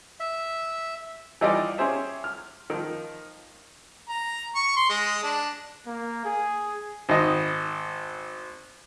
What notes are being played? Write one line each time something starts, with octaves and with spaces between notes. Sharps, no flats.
E5
E3 G3 D#4 F4 G4 D5
C#4 G4 G#4 C5 E5
F6
D#3 F3
A#5
C#6
C6
G#3
D4
A#3
G#4
G#1 D#5